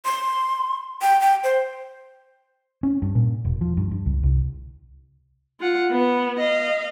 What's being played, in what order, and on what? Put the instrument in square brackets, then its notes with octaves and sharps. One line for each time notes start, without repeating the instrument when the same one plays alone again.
[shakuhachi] C6
G5
G5
C5
[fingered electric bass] C#4
G2
A#2
E1
F3
G2
G2
C#2
C2
[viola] F4 F#5
B3
D#5 F5